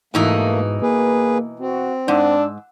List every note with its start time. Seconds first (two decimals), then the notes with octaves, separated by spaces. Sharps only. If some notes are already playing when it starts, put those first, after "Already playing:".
0.14 G#2 B2 E3 A3 A#3 D#4
0.82 A#3 G#4 B4
1.59 C4 F#4
2.08 G#2 D4 E6